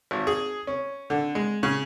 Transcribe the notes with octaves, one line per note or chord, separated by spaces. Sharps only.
G#1
G#4
C#4
D3
G#3
C#3